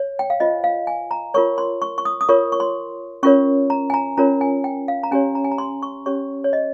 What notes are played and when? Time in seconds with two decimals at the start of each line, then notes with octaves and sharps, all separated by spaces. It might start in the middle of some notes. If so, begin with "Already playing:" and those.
Already playing: C#5
0.19 G5
0.30 F5
0.40 F4 C5 D#5
0.64 F5
0.87 G#5
1.11 A#5
1.34 F4 A#4 C#5 C#6
1.58 C6
1.82 C#6
1.98 C#6
2.05 D#6
2.21 D#6
2.29 F4 A#4 C#5 C#6
2.52 C#6
2.60 C6
3.23 C#4 F4 A#4 C#5 C#6
3.70 A#5
3.90 G#5
3.94 A#5
4.17 C#4 F4 A#4 C#5 A#5
4.41 G#5
4.64 G5
4.88 F5
5.03 A#5
5.11 C#4 G4 C#5 G#5
5.35 A#5
5.44 G#5
5.51 A#5
5.58 C6
5.83 C#6
6.06 C#4 G4 C#5 C#6
6.44 C#5
6.53 D#5